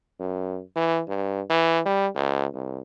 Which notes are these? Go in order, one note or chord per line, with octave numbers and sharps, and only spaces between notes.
F#2
E3
G2
E3
G3
C#2
C2